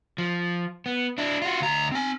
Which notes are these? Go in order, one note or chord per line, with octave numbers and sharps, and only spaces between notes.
F3
B3
D4 E4
F4 F#4
D2 A#5
C4 G#5